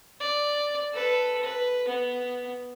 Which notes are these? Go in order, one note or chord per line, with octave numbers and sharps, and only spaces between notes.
D5
A4 B4
B4
B3